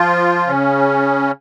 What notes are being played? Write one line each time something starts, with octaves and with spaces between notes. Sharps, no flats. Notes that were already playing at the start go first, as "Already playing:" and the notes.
Already playing: F3 F4
C#3 C#4